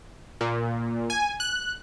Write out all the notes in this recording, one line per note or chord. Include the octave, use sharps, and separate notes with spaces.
A#2
G#5
F#6